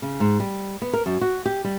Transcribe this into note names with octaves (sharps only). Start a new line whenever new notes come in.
C#3
G#2
G3
B3
A#4
F#2
F#4
G4
G3